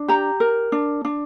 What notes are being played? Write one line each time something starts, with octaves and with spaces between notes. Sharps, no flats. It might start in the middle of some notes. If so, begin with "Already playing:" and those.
Already playing: D4
G4 A#5
A#4
D4
D4